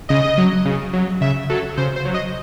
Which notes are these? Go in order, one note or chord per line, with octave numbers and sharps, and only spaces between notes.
C#3 D#5
F#3
C#3
F#3
C#3 E5
F#3 A4
C#3 C5
C5
F#3
D#5